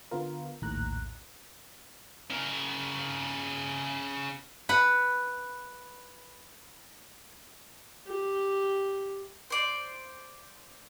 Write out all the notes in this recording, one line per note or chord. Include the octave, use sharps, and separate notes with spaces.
D3 B3 F4 A#4
A#1 D#2 A2 A#5 F#6
C#3 A#4
B4 F#5
G4
C5 D5